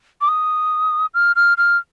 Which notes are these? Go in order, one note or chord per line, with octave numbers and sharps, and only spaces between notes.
D6
D#6
F6
F6
F6